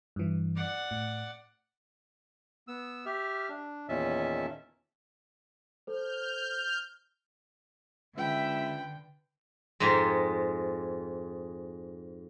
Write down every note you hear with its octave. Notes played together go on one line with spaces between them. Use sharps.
G2 E3
D5 F#5
A2
B3 E6
G4 E5 F6
D4
E2 A#2 D#3 C#4 E5 A5
A4 C5 F6 G6
C#2 D3 B4 E5 G5
F2 G#2 G#3